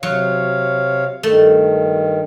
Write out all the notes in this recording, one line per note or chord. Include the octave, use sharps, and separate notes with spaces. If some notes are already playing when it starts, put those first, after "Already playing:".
C3 F#3 C#5 F5
G2 D#3 A3